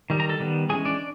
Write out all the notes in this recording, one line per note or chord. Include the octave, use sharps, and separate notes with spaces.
D#3 G3
A#4 A#5
A4 A5
D#3 G3 B3
E3 G#3 C#4 G#4 G#5
D4 D5